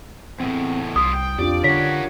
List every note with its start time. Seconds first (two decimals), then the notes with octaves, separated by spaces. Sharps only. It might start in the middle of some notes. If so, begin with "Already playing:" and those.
0.40 E2 A2 C4
0.96 C2 E4 F4 D#6
1.13 G5
1.39 F2 D4 F4 G4 D5
1.64 D3 A#4 C#5 F#5 B6